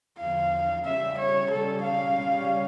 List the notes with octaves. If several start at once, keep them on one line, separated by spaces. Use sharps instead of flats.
E2 D3 F3 F5
C#3 G3 C#4 E5
C#5
C#3 G3 C#4 A4
F5
C#3 G3 C#4